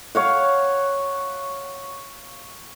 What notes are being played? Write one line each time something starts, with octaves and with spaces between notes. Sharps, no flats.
C#5 F5 F#5